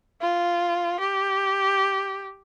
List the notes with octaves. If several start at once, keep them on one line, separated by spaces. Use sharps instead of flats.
F4
G4